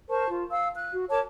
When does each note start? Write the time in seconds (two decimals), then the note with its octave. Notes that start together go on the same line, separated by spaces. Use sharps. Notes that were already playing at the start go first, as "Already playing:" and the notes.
0.09 A#4 C5 A5 C#6
0.29 F4
0.50 F5 E6
0.76 F#6
0.93 F#4
1.10 A#4 C#5 A5 D6